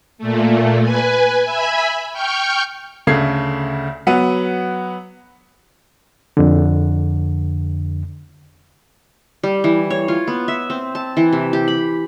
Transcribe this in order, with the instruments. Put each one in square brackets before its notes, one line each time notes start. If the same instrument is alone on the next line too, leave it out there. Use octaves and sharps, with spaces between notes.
[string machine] A#2 A3
B4 G#5
E5 G#5 B5
G5 C#6 F6 G6
[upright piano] D2 C#3 A3 G#6 C7
F#3 B3 F#5 D#7
[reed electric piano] F2 D3
[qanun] G3
E3
C#5
F4
B3
E5
C4
A5
E3
C3
G4
B5